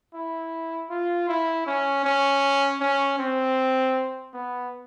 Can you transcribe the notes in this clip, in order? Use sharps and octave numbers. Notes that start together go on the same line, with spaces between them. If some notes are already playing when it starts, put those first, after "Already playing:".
E4
F4
E4
C#4
C#4
C#4
C4
B3